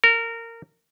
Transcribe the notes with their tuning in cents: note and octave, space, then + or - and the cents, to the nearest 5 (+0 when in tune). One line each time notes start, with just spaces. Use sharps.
A#4 -20